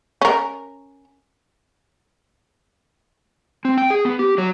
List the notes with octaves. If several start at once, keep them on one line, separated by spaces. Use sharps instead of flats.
C#4 A#4
C4
G5
G#4
B3
G4
F#3